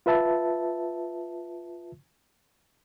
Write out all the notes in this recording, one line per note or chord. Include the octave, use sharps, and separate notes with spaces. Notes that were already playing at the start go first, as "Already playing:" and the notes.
F4 B4 E5 A5